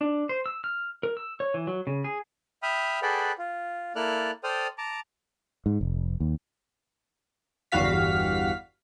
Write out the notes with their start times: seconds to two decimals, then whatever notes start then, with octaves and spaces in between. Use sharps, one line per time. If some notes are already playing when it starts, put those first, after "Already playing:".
0.01 D4
0.29 C5
0.46 E6
0.64 F6
1.03 A#4
1.17 E6
1.40 C#5
1.54 E3
1.67 F#3
1.87 C#3
2.04 G#4
2.63 E5 G5 B5 D#6 F6
3.02 G#4 A4 B4 D5 F#5 G5
3.38 F4
3.96 A#3 E4 A4 D5 F6 F#6
4.44 A4 C5 D5 G5 D#6 F6
4.78 A5 A#5 D6
5.66 G#2
5.81 F1
6.20 D#2
7.72 G1 E2 G3 F#4 F5 B6